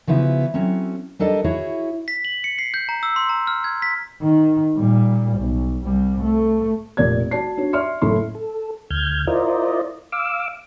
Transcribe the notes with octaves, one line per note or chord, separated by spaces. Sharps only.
C#3 F3 B3 E4 F#4
F#3 C4 C#4 F#4 A4
G3 D4 A4 A#4 D5 D#5
E4 F#4 G#4 C#5
B6
F#7
C#7
C7
G6
A#5
E6
C6
A#5
F6
G#6
B6
D#3
A#2 G3
B1
C2 G3
A3
F1 A#2 D5 G#6
F#4 D5 A5 C7
D4 F#4 C#5
D5 E5 C6 F6 C#7
F#1 A2 A3 E4 C6
A4
D2 F6 G6 G#6
E4 F4 A#4 C5 D5 D#5
F5 D6 E6